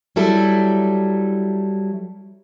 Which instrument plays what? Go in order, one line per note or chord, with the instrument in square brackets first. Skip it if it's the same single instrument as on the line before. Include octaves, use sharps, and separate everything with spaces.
[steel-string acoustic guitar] F#3 G3 E4 A4